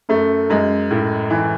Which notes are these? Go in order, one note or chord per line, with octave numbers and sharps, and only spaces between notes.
F#2 A3
F#2 G#3
A2
E3